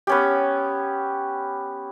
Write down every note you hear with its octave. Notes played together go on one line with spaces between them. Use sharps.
B3 C#4 G4